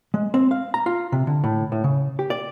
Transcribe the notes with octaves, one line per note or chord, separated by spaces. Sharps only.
G#3
C4
F5
A#5
F4
C3
D3
A2
A2
C#3
G4
D5